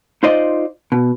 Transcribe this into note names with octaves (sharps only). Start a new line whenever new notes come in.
D#4 F4 C5 D5 D#5
B2